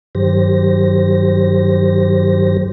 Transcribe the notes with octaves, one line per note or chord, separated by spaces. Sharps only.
G2 D#3 F#3 G4 C5 A#6